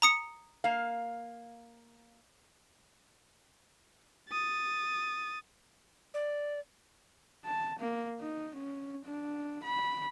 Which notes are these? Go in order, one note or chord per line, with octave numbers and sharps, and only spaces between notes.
A#5 D#6 C#7
A#3 F5
D#6 A6
D5
A5
A#3
D#4
C#4
D4
B5